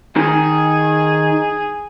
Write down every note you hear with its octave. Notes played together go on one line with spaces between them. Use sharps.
D#3 G#4